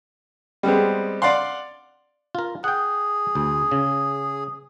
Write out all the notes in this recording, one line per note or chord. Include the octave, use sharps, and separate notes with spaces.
G3 G#3 B3 C4
D5 F5 F#5 C6
F4 A#4
G#4 F#5 G5
D2
C#3